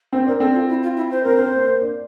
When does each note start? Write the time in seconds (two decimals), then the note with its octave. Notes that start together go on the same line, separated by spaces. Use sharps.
0.13 C4 C5
0.26 D4 A#4
0.40 C4 A4
0.54 F4
0.69 E4
0.83 F4
0.97 E4
1.11 C5
1.23 C4 A#4
1.36 C4 C5
1.53 A#3
1.67 A#3
1.81 D4